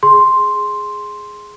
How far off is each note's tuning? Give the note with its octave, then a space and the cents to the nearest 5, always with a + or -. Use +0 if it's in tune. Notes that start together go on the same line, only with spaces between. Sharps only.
G#4 +0 C6 +0